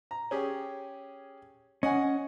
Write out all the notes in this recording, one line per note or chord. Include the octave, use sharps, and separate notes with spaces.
A#5
C#4 G4 G#4
C#4 D#5 F#5 G#5